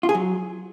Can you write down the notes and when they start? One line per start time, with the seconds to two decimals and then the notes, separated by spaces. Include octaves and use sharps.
0.03 F4
0.09 G#4
0.15 F#3